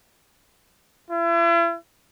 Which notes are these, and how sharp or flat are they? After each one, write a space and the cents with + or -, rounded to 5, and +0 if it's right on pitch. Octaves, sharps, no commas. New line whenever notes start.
E4 +40